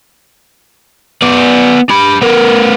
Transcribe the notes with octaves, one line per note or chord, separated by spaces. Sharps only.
B3 D5
D4 B5
B3 A#4